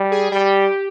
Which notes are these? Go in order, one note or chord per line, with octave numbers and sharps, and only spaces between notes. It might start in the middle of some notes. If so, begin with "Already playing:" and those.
Already playing: G3
G#4
G3 G4